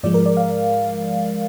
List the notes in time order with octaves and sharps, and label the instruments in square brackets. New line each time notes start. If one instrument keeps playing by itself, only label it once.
[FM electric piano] G#2 F3 G#3 D5
A#4
D5
F5